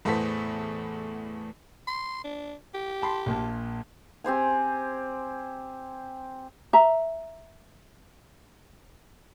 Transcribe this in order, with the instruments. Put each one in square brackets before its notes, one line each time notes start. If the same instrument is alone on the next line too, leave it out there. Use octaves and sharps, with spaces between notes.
[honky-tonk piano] E2 A2 B3 A4 C5 B6
[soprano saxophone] C6
D4
G4
[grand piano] A5 B5 C6
A#1 A#2 A5
[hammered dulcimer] C4 G4 C5 G#5
[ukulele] E5 A#5